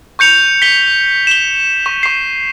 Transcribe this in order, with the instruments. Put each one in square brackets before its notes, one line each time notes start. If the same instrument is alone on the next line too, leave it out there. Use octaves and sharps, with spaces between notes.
[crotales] C#6 G6 C#7 F7
B6 G7
E7 G7
C#6
C#6 C7